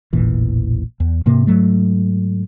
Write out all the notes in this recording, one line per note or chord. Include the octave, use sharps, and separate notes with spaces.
E1 A1 A#2 E3
E2
G#2 C3 A#3
G#2 F#3 A3